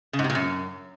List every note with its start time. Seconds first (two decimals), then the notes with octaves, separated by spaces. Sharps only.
0.13 C#3
0.19 G#2
0.24 C3
0.30 A#2
0.35 F#2